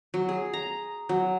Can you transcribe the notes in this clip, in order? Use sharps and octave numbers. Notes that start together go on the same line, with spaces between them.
F#3
G#4
A#5
F#3